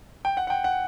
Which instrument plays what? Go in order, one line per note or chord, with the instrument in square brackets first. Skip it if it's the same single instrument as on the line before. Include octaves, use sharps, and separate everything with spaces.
[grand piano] G5
F#5
F#5
G5
F#5